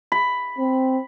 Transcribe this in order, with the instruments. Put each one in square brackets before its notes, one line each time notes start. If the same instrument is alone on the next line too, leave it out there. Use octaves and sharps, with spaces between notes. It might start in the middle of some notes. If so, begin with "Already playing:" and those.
[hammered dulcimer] B5
[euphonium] C4